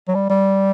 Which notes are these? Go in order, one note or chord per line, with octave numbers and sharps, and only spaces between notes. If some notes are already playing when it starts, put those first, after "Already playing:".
F#3
G3
G3